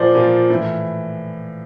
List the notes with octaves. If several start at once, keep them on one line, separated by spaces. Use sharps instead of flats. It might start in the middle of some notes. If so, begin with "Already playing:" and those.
Already playing: A#2 F3 C5 D5
A#2 F3
A2 E3